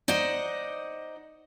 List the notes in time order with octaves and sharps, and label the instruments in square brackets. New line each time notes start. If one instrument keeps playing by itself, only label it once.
[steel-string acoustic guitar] D#4 C5 D5 D#5 F#5